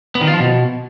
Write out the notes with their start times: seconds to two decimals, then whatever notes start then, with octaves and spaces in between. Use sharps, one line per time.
0.15 B3
0.21 D#3
0.27 F4
0.34 F3
0.40 B2